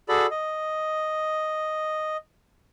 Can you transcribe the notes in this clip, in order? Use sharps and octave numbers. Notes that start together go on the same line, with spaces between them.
F#4 G#4 A4 D5 B5
D#5